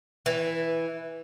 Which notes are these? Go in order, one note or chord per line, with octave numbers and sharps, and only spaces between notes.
E3